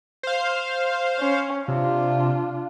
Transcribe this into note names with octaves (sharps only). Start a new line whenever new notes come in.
C5 F5
C#4
C3 D4 F4